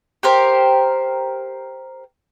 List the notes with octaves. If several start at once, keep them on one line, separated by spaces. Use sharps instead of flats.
G4 A#4 C5